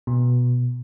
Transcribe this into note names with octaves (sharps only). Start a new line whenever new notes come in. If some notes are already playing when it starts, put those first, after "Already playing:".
B2